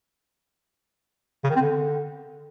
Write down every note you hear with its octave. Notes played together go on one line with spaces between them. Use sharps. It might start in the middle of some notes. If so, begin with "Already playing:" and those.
C#3
D#3
C4
D3